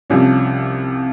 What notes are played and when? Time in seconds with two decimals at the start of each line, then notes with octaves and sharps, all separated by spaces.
0.10 C2 C3 F3 C#4